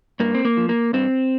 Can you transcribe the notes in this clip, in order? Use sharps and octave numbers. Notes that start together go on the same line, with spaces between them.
G2 A#3
C4
A#3
F3
A#3
G2 C4